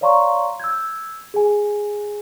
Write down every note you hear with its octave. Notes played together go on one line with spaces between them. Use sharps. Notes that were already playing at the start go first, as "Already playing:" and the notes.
C#5 D5 F5 A#5 C6 C#6
E6 G6 G#6
G#4 G#5